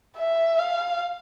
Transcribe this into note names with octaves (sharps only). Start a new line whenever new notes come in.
E5
F5